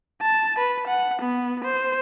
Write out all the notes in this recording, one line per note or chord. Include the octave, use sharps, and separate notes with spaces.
A5
B4
F#5
B3
C5